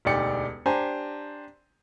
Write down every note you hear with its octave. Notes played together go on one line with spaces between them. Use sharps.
E1 D2 D#4 G4 D5 C#7
D4 G4 C5 G#5 A#5